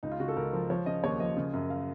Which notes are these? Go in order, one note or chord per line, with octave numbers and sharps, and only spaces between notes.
C#2 D#4
F4
C#3 F#4
A4
C#2 A#4
F3 A#4
F3 C#5
C#3 D#5
D#2 C#5
F3 D#5
C#3
F#2
F5